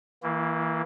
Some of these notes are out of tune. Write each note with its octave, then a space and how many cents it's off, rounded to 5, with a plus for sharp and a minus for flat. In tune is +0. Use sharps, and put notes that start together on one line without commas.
E3 -25 A#3 +0 E4 +30